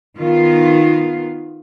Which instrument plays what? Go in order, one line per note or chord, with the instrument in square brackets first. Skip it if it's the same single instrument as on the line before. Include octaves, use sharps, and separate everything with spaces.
[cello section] D#3 B3 F4